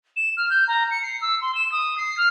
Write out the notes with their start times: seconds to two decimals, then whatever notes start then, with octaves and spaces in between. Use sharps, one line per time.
0.16 E7
0.37 F6
0.50 G6
0.67 A#5
0.90 C#7
1.02 C7
1.21 E6
1.41 C6
1.54 E7
1.71 D#6
1.97 C7
2.17 F6